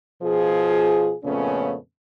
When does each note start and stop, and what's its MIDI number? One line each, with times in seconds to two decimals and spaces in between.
0.23 1.14 47
0.23 1.14 53
0.23 1.14 65
0.23 1.14 68
1.24 1.75 41
1.24 1.75 46
1.24 1.75 49
1.24 1.75 57
1.24 1.75 59
1.24 1.75 61